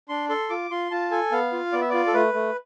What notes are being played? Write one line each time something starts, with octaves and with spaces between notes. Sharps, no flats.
D4 C6
A4 C6
F4 D6
F4 C6
F4 A5
A4 G#5
B3 F5
F4
B3 D5
E5
F4 D5
A4
A3 B4
A3